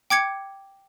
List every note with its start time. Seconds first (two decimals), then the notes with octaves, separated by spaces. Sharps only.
0.10 G5 D6 G#6 C#7